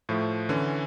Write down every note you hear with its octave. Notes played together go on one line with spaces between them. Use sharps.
A2 F3 A3
D3 E3 C#4